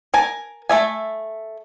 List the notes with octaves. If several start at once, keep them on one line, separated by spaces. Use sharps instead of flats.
A#4 G#5 A5
A3 E5 G#5